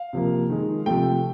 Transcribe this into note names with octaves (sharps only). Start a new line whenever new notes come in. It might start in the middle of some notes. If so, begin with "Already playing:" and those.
Already playing: F5
C3 F3 A#3
D#3 G#3
C3 F3 A3 G5